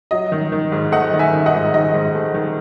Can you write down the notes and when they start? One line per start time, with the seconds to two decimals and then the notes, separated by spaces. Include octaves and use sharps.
0.11 F#3 D#5
0.32 D#3
0.52 D#3
0.72 G#2
0.92 A3 D#5 F#5
1.13 D#3
1.19 E5 G#5
1.33 D#3
1.46 D#5 F#5
1.54 G#2
1.74 D#3 D#5
1.94 G#2
2.15 A3
2.34 D#3